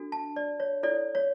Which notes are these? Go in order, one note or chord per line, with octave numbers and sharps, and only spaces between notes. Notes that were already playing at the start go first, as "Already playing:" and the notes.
Already playing: D4 F#4 A4
A5
D5
C#5
E4 A4 C#5 D5
C#5